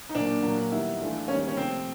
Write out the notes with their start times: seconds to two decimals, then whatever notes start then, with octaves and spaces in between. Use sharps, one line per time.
0.09 D#4
0.15 A#2 F#3 A#3 D4
0.43 A#2 F#3 A#3
0.71 D#3 G3 B3 E4
1.00 E3 A3 D4 F4
1.28 D#3 G3 A#3 C#4
1.48 C#4
1.57 C3 F3 A3 C4